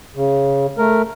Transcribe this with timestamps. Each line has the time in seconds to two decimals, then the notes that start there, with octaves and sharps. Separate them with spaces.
0.16 C#3
0.78 A3 A#4